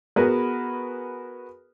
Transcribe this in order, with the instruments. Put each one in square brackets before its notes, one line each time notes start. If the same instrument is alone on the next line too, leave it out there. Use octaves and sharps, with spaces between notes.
[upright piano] B3 F#4 G#4 A#4 B4